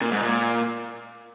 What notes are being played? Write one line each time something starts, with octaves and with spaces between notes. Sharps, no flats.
A#2
G#2
A#2